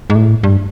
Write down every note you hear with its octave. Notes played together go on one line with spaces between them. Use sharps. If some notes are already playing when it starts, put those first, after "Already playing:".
G#2
A2
G2